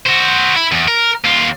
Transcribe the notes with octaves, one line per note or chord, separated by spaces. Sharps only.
F#4 C5
E4
E2
A#4
D#2 F4